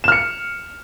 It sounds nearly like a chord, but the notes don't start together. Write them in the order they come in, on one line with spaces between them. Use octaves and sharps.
E7 F6 C#7